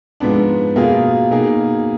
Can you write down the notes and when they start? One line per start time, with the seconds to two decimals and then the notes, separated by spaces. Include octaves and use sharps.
0.20 G#2 F3 G#3 B3 D4
0.76 B2 A#3 F4 G#4
1.31 B2 A#3 D#4 G#4